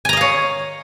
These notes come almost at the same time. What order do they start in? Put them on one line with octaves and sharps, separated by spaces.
G#5 A#5 D#5 F5 C#5